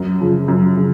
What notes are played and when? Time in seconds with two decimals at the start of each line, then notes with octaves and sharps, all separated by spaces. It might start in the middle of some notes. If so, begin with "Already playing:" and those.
Already playing: F#2
0.20 C#3 F3
0.48 F#2
0.77 C#3